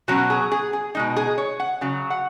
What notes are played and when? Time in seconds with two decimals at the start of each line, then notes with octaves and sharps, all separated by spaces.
0.08 B2 F#3 C#4 F#4
0.30 G#4
0.52 G#4
0.73 G#4
0.95 B2 G#3 D#4
1.16 G#4
1.38 C#5
1.60 F#5
1.81 C#3 F#3
2.10 F#5